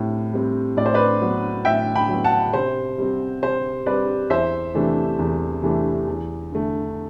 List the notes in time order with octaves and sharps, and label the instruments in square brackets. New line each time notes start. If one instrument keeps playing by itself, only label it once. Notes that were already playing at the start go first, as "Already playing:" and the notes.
Already playing: [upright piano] A2 G3 C4
G3 C4
A2 D5
C5
B4 D5
F#3 B3
A2 E5 G5
G5 B5
F#3 B3
F#5 A5
C3 C5
G3 C4
C3 C5
G3 C4 B4 D5
E2 C5 E5
C3 E3 A3 D4
E2
C3 E3 A3 D4
E2
D3 A3